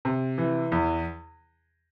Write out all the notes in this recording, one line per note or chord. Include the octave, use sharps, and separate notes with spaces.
C3
E3
E2